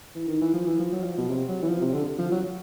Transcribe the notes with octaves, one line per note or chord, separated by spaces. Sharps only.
E3
D#3
E3
F3
E3
F3
F#3
F3
B2
C3
F#3
E3
F3
C3
D3
F3
F#3